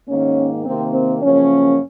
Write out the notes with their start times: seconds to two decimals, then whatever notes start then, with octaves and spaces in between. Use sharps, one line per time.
0.08 G#2 D#3 A#3 C#4
0.65 C3 D#3 A#3 C4
0.94 C4
1.23 F#2 C#3 F3 A#3 C#4